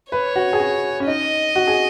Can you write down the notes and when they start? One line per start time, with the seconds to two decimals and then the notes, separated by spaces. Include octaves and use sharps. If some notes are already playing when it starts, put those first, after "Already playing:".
0.12 B4 C#5
0.36 F#4
0.53 G#4
0.59 F#4
1.00 C#4
1.07 D#4 D#5
1.56 F#4
1.67 G#4